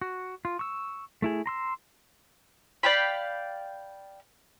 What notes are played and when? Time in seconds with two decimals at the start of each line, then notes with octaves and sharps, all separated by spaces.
0.02 F#4
0.45 F4
0.59 C#6 E6
1.22 A3 E4 G#4
1.46 A#5 C6 E6
2.83 D5 F5 G5 B5